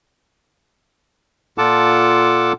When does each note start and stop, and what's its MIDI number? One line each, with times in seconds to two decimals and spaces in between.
1.58 2.53 46
1.58 2.53 65
1.58 2.53 69
1.58 2.53 78
1.58 2.53 81
1.58 2.53 86